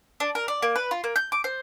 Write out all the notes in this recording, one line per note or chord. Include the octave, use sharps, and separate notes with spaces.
D4
A#4
D5
A#3
B4
F4
A#3
G6
D6
C5